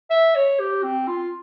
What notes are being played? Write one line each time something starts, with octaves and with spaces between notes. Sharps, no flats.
E5
C#5
G4
C4
F4